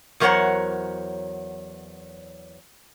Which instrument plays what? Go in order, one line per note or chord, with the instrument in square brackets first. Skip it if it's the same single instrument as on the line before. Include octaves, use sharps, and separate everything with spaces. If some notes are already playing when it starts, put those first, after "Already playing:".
[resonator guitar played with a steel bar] E2 F#3 A#4 C5 C#5 F#5